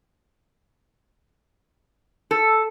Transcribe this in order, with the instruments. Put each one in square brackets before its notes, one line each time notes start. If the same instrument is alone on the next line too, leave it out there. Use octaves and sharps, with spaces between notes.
[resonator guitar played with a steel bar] A4